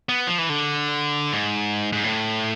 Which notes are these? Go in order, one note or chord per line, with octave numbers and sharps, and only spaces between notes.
B3
F3
E3
D3
G#2
G#2
A2